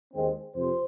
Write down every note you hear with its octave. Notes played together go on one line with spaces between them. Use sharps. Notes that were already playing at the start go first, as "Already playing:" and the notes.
D#2 D#3 G#3 C4
F2 C3 C5